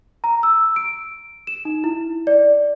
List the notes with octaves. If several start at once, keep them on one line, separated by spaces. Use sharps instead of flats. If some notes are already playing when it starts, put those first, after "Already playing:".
A#5
E6
D7
E7
D#4
E4
D5